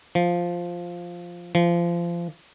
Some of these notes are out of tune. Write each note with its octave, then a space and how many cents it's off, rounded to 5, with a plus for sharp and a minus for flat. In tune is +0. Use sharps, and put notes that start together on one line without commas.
F3 +0
F3 -25